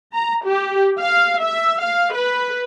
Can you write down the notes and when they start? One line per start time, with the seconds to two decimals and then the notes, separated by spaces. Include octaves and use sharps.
0.14 A#5
0.45 G4
0.98 F5
1.40 E5
1.81 F5
2.14 B4